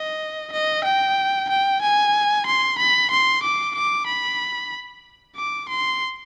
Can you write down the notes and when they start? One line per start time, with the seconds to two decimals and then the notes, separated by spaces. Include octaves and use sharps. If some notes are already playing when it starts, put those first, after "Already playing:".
Already playing: D#5
0.53 D#5
0.84 G5
1.49 G5
1.82 G#5
2.46 C6
2.79 B5
3.11 C6
3.43 D6
3.75 D6
4.07 B5
5.36 D6
5.69 C6